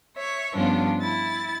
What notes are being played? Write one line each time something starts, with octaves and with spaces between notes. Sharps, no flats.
C#5 E5 C#6
G2 F3 B3 C#4 D4 F4
E4 A6